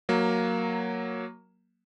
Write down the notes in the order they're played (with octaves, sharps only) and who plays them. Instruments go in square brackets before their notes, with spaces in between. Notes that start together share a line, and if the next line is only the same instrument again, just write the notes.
[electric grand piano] F#3 A#3